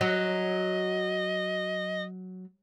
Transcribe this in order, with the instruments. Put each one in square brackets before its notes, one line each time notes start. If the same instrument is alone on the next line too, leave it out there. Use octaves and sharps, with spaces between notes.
[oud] F#3 [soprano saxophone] D#5